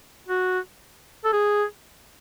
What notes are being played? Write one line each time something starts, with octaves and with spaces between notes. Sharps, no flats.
F#4
A4
G#4